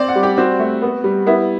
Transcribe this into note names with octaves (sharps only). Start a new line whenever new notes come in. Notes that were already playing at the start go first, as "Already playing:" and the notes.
Already playing: C4 D5
F#5
G3
G4
C4 F#4
A3
B3
G3
B3 E4